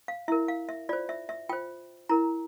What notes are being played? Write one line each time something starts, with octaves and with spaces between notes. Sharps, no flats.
F5
E4 A#4 E5
F5
E5
F4 C5 D5
E5
E5
F4 C5 G5
E4 A#4 A#5